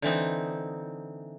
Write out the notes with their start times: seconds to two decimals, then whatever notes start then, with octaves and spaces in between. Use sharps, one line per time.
0.02 D3 E3 C4 D#4